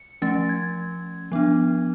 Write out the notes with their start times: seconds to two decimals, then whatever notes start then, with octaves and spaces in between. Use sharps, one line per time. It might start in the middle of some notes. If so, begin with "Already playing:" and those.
Already playing: C#7
0.22 F3 A3 C#4 A6
0.49 G#6
1.32 F3 B3 D4